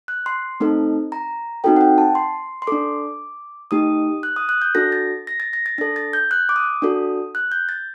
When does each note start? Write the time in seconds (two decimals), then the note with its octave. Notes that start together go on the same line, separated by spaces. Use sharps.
0.08 F#6
0.26 C6
0.60 A3 C4 D#4 A4
1.12 A#5
1.64 C4 D#4 F#4 A4 G5
1.76 F#5
1.81 G5
1.98 A5
2.15 C6
2.62 C6
2.67 D4 A4 D6
3.71 A3 D#4 G4 D#6
4.23 F#6
4.36 D#6
4.49 F#6
4.62 G6
4.75 D4 F#4 A4 A#6
4.92 A6
5.27 A#6
5.40 A6
5.53 A#6
5.66 A6
5.78 D4 A4 A#6
5.96 A6
6.13 G6
6.31 F#6
6.49 D6
6.56 D#6
6.82 D4 F#4 A4
7.35 F#6
7.52 G6
7.69 A6